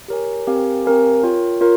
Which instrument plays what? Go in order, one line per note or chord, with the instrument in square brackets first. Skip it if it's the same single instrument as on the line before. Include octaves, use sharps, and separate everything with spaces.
[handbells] G4 A#4 C#5 G#5
C4 G4 A#4 F5 G#5
C4 G4 A#4 F5 G#5
F4 A#4 C#5 G5
F4 A#4 C#5